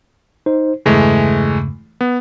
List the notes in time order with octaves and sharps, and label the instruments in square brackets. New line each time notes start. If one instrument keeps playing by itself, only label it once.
[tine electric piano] D#4 C5
[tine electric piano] E2 G2 C#3 [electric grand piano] E3 G#3 A3
[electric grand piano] B3